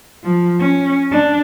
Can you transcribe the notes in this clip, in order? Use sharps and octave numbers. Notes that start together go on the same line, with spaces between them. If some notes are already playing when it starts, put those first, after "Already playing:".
F3
C#4
D4